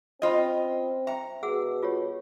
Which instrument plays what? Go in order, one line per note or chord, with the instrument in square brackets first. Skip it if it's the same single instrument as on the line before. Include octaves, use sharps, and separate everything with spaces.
[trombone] C4 [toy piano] C#4 B5 [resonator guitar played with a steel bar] F4 D#5
[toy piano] E5 G5 [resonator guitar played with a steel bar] A#5
[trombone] B2 [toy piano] G#4 F#5 E6
[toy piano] F4 G4 C#5